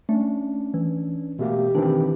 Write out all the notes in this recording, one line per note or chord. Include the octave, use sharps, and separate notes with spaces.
A3 C#4 D4
E3
B2 A3 A#3 G4
D#3 E3 C4 D4